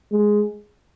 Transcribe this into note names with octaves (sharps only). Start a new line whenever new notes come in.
G#3